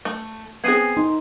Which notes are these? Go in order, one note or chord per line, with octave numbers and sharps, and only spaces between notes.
A3
B3 C4 G#4 G#6 C7 D#7
D#4 C6